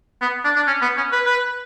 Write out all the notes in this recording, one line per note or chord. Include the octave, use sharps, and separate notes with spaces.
B3
D4
D4
C#4
B3
C#4
B4
B4